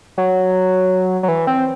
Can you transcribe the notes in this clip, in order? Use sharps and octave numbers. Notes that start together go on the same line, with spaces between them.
F#3
F#3
E3
C4